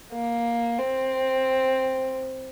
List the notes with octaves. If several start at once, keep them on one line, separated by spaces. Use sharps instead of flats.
A#3
C4